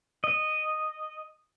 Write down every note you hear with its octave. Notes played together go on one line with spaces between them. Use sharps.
D#5